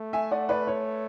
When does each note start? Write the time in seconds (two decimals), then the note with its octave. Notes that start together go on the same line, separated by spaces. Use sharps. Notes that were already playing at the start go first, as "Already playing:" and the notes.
Already playing: A3
0.13 E5 G#5
0.31 D5 F#5
0.49 B4 D5
0.67 C#5